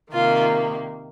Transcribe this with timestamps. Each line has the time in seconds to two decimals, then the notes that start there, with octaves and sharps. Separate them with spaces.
0.13 C3 D#3 A#3 F4